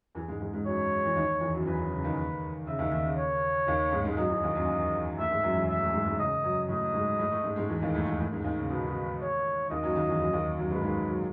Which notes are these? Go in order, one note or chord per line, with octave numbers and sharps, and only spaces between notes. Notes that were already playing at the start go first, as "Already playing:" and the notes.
E2 E3
G#2 G#3
G#2 G#3
G#2 G#3
F#2 F#3 C#5
E3
D#2 D#3
E2 E3
F#2 F#3
E2 E3 B4
F#2 F#3
C#3
D#2 D#3
C#3 E5
D#2 D#3
D#2 D#3
C#3
C#5
D#2 D#3
G#2 G#3
G#2 G#3
F#2 F#3 D#5
E2 E3
D#2 D#3
F#2 F#3
A2 A3 E5
G#2 G#3
F#2 F#3
E2 E3
E5
A2 A3
G#2 G#3
G#2 G#3
C#3 D#5
F#2 F#3
A2 A3 D#5
G#2 G#3
A2 A3
A2 A3
G#2 G#3
G#2 G#3
E2 E3
D#2 D#3
A2 A3
A2 A3
A2 A3
G#2 G#3
D#2 D#3
C#3
B2 B4
B2
C#5
D#2 D#3 D#5
F#2 F#3
D#2 D#3
E2 E3
F#2 F#3
D#2 D#3
F#2 F#3
G#2 G#3 B4
G#2 G#3
F#3